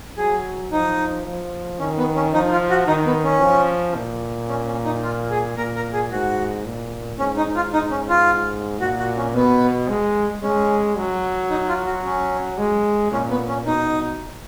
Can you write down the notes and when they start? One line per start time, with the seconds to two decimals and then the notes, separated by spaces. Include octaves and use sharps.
0.18 F#3 G#4
0.72 F3 D#4
1.26 F3
1.79 D#3 C#4
1.98 B3
2.16 C#4
2.34 F3 D#4
2.51 F4
2.70 F#4
2.87 D#3 D#4
3.06 B3
3.23 C#4
3.41 F3
3.96 A#2
4.49 C#4
4.67 C#4
4.85 D#4
5.03 F4
5.30 G#4
5.57 A#2 A#4
5.75 A#4
5.93 G#4
6.11 G#2 F#4
6.65 A#2
7.19 G#2 C#4
7.37 D#4
7.56 F4
7.73 D#4
7.91 C#4
8.09 F4
8.81 A#2 F#4
8.99 F#4
9.17 C#4
9.34 B2 B3
9.89 G#3
10.43 G#3 C#4
10.97 F#3
11.50 D#4
11.68 F4
11.86 F#4
12.05 C#4
12.58 G#3
13.12 A#2 C#4
13.30 B3
13.48 C#4
13.66 B2 D#4